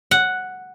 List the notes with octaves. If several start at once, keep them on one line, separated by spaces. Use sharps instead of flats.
F#5